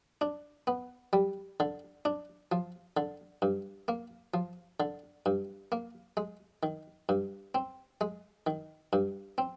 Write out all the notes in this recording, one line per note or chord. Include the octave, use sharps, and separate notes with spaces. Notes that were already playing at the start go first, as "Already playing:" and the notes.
D4
B3
G3
D3
D4
F3
D3
G2
A#3
F3
D3
G2
A#3
G#3
D#3
G2
C4
G#3
D#3
G2
C4